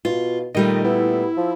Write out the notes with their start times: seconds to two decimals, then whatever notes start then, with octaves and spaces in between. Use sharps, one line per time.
0.05 B2 F4
0.55 A#2 D#3 G3 A3 D#5
0.84 B3 E4
1.37 F3